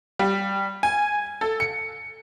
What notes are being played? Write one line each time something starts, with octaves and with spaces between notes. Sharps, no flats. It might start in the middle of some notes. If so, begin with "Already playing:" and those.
G3
G#5
A4
C#7